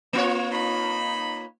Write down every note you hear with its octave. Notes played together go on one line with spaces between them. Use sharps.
A#3 F4 C#5
D#4 B5